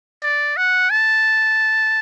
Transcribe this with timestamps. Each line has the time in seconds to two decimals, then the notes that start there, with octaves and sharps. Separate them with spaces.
0.23 D5
0.57 F#5
0.90 A5